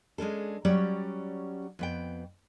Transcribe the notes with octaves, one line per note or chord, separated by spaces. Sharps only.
G#3 C#4 D4 A4
F#3 G3 C#4 G4 C#5 D5
F2 B3 G5